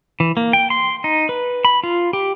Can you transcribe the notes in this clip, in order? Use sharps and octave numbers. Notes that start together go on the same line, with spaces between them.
E3
A#3
G5
C6
D#4
B4
B5
F4
G4